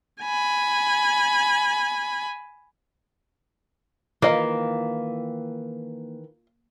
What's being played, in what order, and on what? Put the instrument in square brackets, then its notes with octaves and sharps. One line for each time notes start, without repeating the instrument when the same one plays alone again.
[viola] G#5 B5
[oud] D#3 E3 [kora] A#3 [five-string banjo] F4 D#5 F5